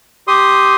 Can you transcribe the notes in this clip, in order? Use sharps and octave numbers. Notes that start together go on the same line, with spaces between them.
G4 C6 D#6